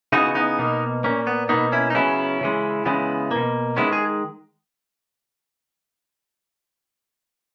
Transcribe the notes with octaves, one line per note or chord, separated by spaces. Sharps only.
C#3 E3 B3 D#4 F#4
B3 D#4
B2 A#3
A#2 A#3 C#4
B3
B2 A#3 B3 D#4
C#4 E4
D#4
C#3 F#3 B3 C#4 E4
C#3 E3 G#3
C#3 E3 G#3 B3
B2 A#3
D#3 G#3 B3 C#4 E4
G#4